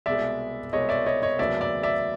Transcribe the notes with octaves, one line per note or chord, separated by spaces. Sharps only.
C2 B2 G#3 D5 E5
C2 B2 G#3 C#5 D#5
D5 E5
C#5 D#5
C#5 D#5
F1 D#2 C#3 F#3 B3 D5 E5
D5 E5
D5 E5